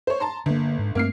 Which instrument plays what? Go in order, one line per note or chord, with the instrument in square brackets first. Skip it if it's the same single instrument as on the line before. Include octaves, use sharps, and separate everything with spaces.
[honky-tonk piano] C5 C#5
A5 A#5 C6
[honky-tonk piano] G1 [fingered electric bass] D3 A#3
[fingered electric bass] G#2
[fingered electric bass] G2 A3 C4 [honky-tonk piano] A#3 F6 C7